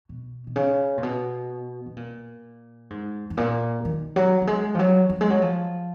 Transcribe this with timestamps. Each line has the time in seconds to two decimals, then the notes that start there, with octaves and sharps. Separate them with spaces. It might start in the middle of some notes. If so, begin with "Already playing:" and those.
0.09 B2
0.47 B2
0.56 C#3
0.98 A#2
1.03 B2
1.86 B2
1.96 A#2
2.90 G#2
3.30 G#2
3.37 A#2
3.85 D#3
4.16 F#3
4.42 F#3
4.47 G#3
4.75 F3
4.79 F#3
5.10 F#3
5.21 G#3
5.30 F#3
5.42 F3